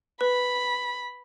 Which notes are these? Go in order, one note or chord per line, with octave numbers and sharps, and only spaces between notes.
B4 B5